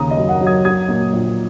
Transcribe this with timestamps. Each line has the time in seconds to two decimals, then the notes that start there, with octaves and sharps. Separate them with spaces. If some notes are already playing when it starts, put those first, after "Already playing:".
Already playing: D#2 C#3 A#5 D#6
0.11 D#5
0.17 F#2
0.29 F#5
0.41 F#3
0.47 D#6 G#6
0.65 F#3 D#6 G#6
0.88 A#2
1.13 A#1